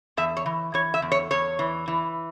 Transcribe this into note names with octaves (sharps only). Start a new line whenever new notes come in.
E2 E5
C#5
E3
E3 C#5
E5
E2
C#5
E2 C#5
E3
E3